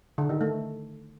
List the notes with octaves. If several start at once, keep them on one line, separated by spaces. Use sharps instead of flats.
D3
D#3
A3